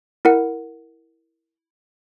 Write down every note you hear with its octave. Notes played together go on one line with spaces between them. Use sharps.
E4 A#4 F#5